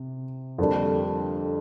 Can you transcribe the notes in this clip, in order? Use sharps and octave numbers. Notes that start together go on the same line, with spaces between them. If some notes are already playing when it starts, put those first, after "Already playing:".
Already playing: C3
F2 D3 G3 A#3 D4